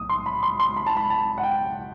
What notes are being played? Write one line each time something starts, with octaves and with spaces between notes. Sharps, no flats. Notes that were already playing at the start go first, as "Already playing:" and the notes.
Already playing: B1 A2 D#6
C6
B5
C6
C6
B5
A5
B5
A5
F#5
G5